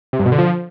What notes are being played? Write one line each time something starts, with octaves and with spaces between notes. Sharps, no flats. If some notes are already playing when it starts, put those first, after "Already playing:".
C3
G2
B2
D3
F3